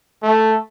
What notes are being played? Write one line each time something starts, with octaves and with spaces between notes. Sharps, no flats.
A3